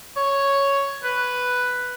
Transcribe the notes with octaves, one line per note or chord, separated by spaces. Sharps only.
C#5
B4